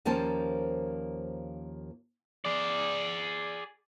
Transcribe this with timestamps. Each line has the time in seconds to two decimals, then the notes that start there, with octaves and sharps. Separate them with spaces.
0.05 D#2 F3 A#3 C#4 C5 A5
2.45 G#4 D5